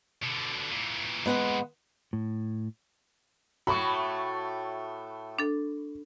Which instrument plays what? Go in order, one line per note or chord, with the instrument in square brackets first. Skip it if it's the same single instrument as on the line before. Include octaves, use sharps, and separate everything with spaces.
[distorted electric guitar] B2 D3
A#2 E3
[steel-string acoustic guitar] G#3 B3 F#5
[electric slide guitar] A2
[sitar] A2 A3 F#4 [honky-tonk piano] B5 C#6
[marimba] D4 A4